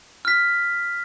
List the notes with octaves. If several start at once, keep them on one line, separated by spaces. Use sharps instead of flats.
F6 B6